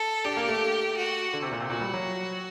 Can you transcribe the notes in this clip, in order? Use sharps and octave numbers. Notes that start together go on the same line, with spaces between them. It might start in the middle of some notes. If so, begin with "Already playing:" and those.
Already playing: A4
D4 G4
A#3
A3
F#4
D3
C3
A#2
C3
A#2 F#4
G3
F#3